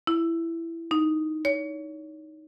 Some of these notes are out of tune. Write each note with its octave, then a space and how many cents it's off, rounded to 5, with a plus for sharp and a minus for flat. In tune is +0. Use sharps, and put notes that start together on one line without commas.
E4 +10
D#4 +0
C#5 +30